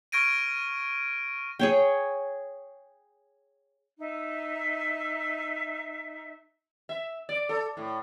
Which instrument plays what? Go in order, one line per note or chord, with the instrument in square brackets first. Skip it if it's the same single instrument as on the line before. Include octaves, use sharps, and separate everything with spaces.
[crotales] C#6 F6 G#6 A#6 D7 D#7
[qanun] G#4 C#5 G5
[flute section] D#4 E5
[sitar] E5
D5
A4
A2